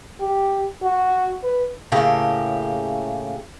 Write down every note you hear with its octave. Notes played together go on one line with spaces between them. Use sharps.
G4
F#4
B4
A2 C#3 A#3 G4